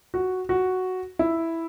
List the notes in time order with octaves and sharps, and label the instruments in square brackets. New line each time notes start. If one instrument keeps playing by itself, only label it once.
[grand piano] F#4
F#4
E4